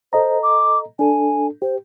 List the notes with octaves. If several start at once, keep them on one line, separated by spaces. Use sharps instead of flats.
A4 C5 D#5 A#5
D6
D4 A4 G#5
G4 C5